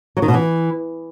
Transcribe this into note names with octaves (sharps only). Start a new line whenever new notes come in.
F#3
D#3
B2
E3